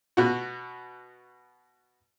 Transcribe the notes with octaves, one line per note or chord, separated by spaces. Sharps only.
B2 F#4